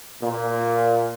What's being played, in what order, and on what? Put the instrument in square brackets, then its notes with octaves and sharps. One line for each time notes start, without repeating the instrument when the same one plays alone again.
[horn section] A#2